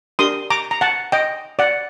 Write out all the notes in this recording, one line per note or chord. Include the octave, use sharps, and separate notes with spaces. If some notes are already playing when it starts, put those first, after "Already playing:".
D4 G4 A#4 C6 D#6
A#5 D6
A#5
F#5 A5
D#5 G5
D5 F#5